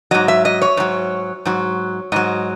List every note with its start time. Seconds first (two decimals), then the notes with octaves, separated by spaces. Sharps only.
0.11 G#2 F#3 D#5
0.28 E5
0.45 D#5
0.62 C#5
0.77 G#2 F#3
1.45 G#2 F#3
2.12 G#2 F#3 D#5